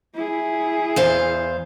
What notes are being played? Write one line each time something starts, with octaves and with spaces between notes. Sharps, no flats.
E4 G#4
E2 C5 F5